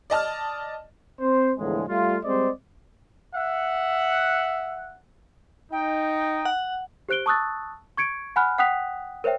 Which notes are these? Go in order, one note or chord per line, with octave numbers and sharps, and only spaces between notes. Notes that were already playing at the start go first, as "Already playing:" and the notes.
D5 D#5 A5 F6
C4 C5
E2 A2 D3 F3 G#3
G3 A3 F4
G3 G#3 C4 C5 D5 D#5
E5 F#5
D#4 G5
F#5
G4 C5 F#6 D7 G7
A5 C#6 D#6 E6 F#6 A6
C#6 G#6 C#7 D7
F#5 G#5 B5 F6 F#6
F#5 G5 D#6 F#6 B6 F7
A#4 C5 C#5 E5 G5